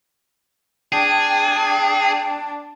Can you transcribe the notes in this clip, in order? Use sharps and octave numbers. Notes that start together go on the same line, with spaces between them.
D4 G#4 G5